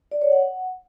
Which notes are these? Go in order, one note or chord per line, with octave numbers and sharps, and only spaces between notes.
D5
C#5
F#5